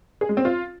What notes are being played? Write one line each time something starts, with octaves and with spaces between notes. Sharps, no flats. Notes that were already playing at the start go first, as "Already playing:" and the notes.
G#4
G#3
C4
F4